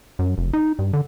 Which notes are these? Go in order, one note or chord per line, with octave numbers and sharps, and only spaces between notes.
F#2
F1
D#4
G2
D3